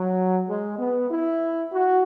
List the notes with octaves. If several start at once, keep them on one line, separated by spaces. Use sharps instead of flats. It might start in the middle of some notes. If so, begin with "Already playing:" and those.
Already playing: F#3
G#3
B3
E4
F#4